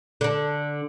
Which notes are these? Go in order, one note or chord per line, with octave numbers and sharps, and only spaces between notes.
D3 D4